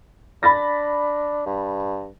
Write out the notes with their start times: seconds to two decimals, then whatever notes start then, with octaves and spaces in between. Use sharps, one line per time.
0.43 D4 B5 A6 A#6
1.46 G2